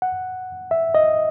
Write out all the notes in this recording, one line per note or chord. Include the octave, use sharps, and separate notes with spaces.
F#5
E5
D#5